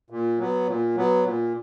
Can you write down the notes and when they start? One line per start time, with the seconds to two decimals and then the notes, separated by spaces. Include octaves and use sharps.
0.10 A#2
0.39 F#3 B3
0.67 A#2
0.96 F#3 B3
1.24 A#2